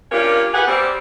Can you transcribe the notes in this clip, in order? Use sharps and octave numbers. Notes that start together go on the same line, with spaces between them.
A#3 C#4 D4 F4 G4 A#4
G4 G#4 B4 F#5
G3 C4